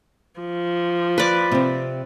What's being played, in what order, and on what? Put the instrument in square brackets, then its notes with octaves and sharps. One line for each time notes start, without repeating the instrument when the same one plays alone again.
[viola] F3
[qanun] B4 D5
[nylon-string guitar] C3 C4